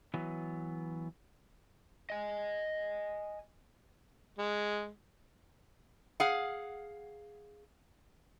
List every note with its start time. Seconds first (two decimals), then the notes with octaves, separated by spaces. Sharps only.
0.14 E3 F#3 B3
2.10 D#5 G#5
4.39 G#3
6.20 G#4 F5 F#5